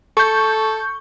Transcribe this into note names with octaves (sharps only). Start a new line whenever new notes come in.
A4 C#6 G6